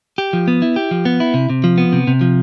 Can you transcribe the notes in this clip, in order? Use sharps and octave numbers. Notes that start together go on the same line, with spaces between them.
G4
F3
B3
E4
G4
F3
B3
E4
C3
C3
F3
B3
C3
C3
F3